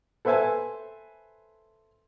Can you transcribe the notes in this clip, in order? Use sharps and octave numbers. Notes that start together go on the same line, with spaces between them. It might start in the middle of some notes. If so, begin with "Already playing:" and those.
A4 B4 C5 E5 G#5 A5